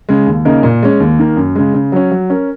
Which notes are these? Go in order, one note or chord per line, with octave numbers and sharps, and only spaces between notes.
C#3 G#3
D#2
C#3 A#3 D#4 A#4
A#2
G#3 C#4
D#2
D#3 A#3
F#2
C#3 G#3
C#3
F#3 C#4
F#3
C#4 A#4